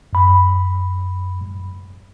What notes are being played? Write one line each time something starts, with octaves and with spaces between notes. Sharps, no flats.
F#2 B5